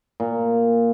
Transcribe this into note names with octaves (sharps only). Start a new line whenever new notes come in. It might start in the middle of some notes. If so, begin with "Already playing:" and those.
A#2